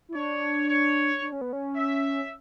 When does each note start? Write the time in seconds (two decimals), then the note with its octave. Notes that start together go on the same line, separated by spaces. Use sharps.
0.09 E4
0.14 D4 C#5
0.69 C#5
1.22 D4
1.32 C#4
1.41 B3
1.53 C#4
1.75 E5